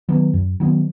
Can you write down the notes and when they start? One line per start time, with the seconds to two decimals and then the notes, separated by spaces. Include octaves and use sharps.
0.09 D#3 F#3 B3
0.34 F#2
0.60 D#3 F#3 B3